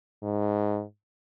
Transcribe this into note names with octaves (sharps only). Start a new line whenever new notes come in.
G#2